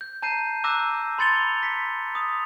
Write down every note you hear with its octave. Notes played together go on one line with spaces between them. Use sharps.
G6
A5 A#5 G6 C7 D#7
A#5 D6 E6 F#6 G6 A#6
B5 C6 A6 C#7 F7 G7
B6 C#7
D#6 F7